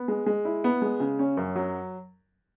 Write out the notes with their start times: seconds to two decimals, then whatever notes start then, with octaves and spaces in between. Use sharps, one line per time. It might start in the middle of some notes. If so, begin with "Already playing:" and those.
Already playing: B3
0.08 G#3
0.26 G#3
0.45 E4
0.64 B3
0.82 G#3
1.00 C#3
1.19 C#4
1.37 F#2
1.56 F#3